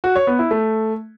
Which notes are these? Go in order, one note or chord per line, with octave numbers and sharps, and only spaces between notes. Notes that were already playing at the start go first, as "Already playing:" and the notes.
F#4
C#5
B3
E4
A3